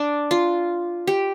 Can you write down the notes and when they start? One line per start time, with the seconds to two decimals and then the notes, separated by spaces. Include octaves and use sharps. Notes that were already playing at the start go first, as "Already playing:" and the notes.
Already playing: D4
0.31 F4
1.07 G4